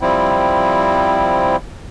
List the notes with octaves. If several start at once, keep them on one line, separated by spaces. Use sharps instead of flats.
F3 G3 C4 E4